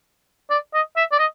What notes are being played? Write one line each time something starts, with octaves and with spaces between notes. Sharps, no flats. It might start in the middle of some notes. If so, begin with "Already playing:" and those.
D5
D#5
E5
D5
D#5